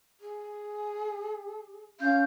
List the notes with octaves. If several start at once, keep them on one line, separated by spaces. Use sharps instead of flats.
G#4
C#4 F5 G6